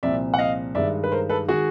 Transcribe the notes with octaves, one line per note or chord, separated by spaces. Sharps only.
C2 A#2 F3 D5 E5
F#5
D#5 F5
G2 D#3 G#3 D5 E5
B4
A#4 C5
A4 B4
D#3 G#3 F#4 G#4